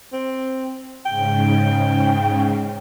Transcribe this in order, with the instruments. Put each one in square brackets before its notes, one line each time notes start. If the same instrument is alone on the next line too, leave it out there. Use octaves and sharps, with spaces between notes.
[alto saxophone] C4
[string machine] G#2 C#3 [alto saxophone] G5